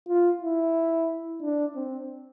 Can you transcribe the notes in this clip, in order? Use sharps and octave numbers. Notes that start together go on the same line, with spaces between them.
F4
E4
D4
C4